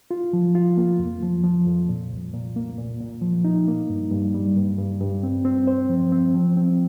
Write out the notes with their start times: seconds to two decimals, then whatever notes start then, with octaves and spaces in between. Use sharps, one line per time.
0.11 F4
0.33 F3
0.55 F4
0.77 A#3
0.99 F2
1.22 F3
1.44 F3
1.67 F2
1.89 A#2
2.11 C2
2.34 A#2
2.56 A#3
2.78 A#2
3.00 A#2
3.22 F3
3.44 D#4
3.68 A#3
3.90 G2
4.11 G2
4.34 G3
4.57 G2
4.78 G2
5.01 G2
5.23 C4
5.45 C4
5.67 C5
5.90 F3
6.12 C4
6.34 F3
6.57 C4